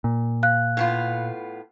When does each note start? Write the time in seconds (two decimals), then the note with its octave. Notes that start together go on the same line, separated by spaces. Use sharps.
0.04 A#2
0.43 F5 F#6
0.77 A2 B3 F4